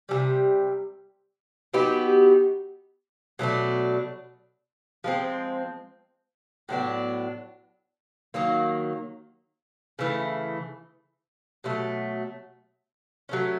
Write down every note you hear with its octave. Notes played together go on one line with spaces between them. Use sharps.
C3 E3 G3
F#3 B3 D#4 G4
B2 F#3 A3 D4
F3 G#3 C4
A2 F#3 B3 D4
D#3 F#3 A#3
C#3 E3 A3
B2 F#3 A3
F#3 A3 C#4